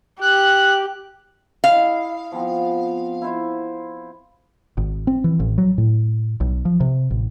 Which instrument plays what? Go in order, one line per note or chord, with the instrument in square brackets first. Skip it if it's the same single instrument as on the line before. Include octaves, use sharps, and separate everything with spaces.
[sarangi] G4 [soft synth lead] F#6
[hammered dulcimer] E4 D#5 [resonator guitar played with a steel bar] F5
[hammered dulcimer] F3 B3 C4
E4 C5
[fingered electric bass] G#1
C4
E3
A1
F#3
A2
B1
F3
C3
A1